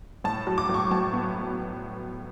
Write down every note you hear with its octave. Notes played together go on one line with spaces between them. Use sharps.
A2 A5
F#3
D6
A2
C#6
A2 A5
B3